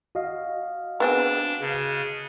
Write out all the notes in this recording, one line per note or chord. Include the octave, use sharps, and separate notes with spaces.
F#4 D#5 F5
B3 C4 D4 G#4
C#3